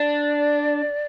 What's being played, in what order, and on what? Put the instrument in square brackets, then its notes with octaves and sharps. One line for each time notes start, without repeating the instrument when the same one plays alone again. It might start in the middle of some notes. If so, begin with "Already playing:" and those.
Already playing: [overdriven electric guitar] D4 [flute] D5